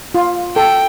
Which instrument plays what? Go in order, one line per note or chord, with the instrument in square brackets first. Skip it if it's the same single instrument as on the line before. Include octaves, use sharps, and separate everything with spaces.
[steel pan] F4
[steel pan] A4 [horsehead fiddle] G5